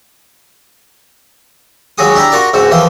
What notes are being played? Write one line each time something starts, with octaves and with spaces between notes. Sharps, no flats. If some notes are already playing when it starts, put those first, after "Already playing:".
D#2 F#3 G#3 F#4 G#4 D#6
D4 E4 G4 A#5
F4 F#4 A#4 D5
C#2 G#2 C4 F#4
D#2 E3 F3 F4 C6